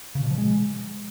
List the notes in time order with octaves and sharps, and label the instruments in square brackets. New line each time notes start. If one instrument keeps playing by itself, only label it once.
[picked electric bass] C#3
B2
F3
G#3